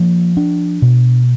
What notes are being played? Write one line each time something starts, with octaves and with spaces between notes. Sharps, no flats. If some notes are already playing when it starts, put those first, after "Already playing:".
Already playing: F3 A#3
D4
B2